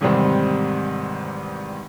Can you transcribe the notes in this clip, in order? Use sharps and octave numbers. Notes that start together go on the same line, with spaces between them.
E2 G#2 C3 D#3 G3 C4